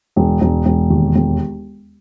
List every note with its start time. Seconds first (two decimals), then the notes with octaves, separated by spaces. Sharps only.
0.16 E1
0.41 E1
0.65 E1
0.90 D#2
1.15 E1